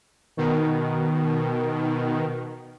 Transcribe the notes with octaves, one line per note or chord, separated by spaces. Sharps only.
B2 D#3